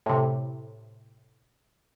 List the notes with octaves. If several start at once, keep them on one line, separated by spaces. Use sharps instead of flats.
A2 C3